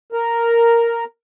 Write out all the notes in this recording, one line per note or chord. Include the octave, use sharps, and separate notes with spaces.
A#4